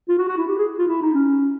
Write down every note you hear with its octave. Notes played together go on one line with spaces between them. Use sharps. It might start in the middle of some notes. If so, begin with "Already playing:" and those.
F4
F#4
F#4
E4
G4
G#4
F4
E4
D#4
C#4